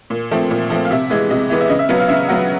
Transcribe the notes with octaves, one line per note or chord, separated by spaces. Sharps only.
A#2
F3 A3 C4
A#2
F3 A3 C4
F5
C3 E5
E3 G#3 B3
C3 D#5
E3 G#3 B3
E5
C#3 D#5
E5
F#3 B3 F5
F5
C#3 E5
F#3 B3 F#5